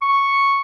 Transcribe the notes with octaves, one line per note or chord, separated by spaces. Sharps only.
C#6